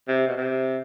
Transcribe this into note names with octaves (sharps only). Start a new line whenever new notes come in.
C3
B2
C3